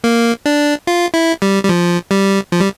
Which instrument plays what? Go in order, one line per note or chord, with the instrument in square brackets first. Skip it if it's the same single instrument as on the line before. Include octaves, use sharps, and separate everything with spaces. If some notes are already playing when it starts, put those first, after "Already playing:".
[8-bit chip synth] A#3
D4
F4
E4
G3
G3
F3
G3
F3
G3